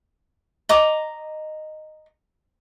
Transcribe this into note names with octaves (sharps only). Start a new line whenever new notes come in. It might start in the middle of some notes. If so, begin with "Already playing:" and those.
D#5 A#5 D6 D#6